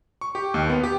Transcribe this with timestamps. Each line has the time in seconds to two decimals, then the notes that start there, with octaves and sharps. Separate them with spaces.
0.21 C#6
0.35 G4
0.54 D#2
0.70 B3
0.83 G4